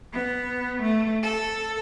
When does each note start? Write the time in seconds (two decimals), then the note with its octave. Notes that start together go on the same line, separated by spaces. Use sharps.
0.13 B3
0.80 A3
1.23 A4